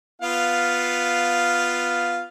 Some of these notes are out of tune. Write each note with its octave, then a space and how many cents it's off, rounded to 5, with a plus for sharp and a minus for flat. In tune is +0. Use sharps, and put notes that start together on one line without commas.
B3 +0 F4 +0 F5 +0